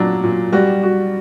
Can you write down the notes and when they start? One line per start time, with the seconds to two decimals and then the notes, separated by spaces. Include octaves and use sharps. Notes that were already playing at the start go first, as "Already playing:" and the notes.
Already playing: A#2 F#3 D4
0.24 A#2
0.53 G3 F#4
0.83 F#4